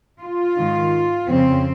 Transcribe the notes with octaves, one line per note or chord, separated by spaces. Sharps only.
F4
G#2 D#3
F2 C#3 C4